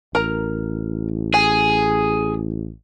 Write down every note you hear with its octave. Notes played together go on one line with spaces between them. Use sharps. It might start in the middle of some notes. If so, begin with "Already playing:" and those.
A1 A#4 A#5
G#4 G#5